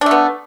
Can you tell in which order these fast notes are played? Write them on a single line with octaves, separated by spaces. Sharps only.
D4 A3 B3